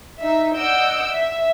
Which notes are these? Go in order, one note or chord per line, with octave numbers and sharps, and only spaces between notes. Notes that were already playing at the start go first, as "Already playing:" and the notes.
D#4 E5
D5 D#5 F#5 E6 G6 D7
E5